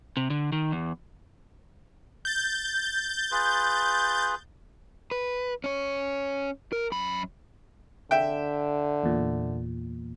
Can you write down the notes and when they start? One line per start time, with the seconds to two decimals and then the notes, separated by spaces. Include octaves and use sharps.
0.17 C3
0.30 D3
0.52 D#3
0.72 E2
2.25 G6 A6
3.32 F4 G#4 B4
5.11 B4
5.64 C#4 C#5
6.72 A#4
6.92 F#2 B5
8.11 D3 E5 G5
9.03 E2 A#2